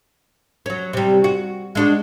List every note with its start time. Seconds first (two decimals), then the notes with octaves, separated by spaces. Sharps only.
0.66 F#3 C#4
0.93 C3 G3
1.24 F#4
1.75 G#3 D4 F#4